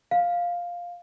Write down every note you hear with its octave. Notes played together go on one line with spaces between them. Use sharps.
F5